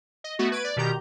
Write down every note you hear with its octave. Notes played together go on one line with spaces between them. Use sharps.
D#5
A3 B3 F#4
B4 G#6 D7
D5
B2 D#3 G4 A#5 G6